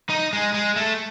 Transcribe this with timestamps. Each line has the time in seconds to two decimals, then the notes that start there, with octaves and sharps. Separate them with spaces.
0.10 D#4
0.33 G#3
0.54 G#3
0.76 A3